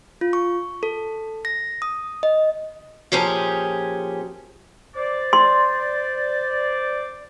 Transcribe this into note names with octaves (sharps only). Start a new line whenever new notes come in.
F4
C#6
A4
A#6
D#6
D#5
A#2 F3 C#4 G4 G#4
C5 D5
C6